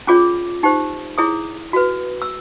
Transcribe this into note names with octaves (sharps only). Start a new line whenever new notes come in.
C#4 F4 G#4 C#5 D6
D#4 G4 C5
E4 G#4 C#5 D#6
F#4 B4
E6